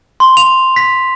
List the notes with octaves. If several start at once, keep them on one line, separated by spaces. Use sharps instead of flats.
C6
F7
B6